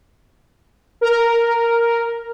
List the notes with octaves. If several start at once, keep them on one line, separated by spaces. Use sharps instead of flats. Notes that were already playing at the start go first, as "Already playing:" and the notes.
A#4